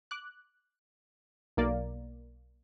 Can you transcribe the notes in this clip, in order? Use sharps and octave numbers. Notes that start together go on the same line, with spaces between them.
D6 F#6
B1 A#3 D5